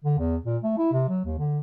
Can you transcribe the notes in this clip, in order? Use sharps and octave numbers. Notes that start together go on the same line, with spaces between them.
D3
E2
A#2
A3
E4
C3
F#3
D#2
D3